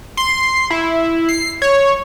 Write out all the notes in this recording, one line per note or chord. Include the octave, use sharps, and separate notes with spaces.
C6
E4
C7
C#5